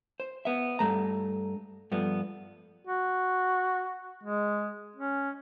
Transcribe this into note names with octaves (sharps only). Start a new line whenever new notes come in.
C5
B3 E5
G2 A3 A#5
G2 F3 A3 B3
F#4
G#3
C#4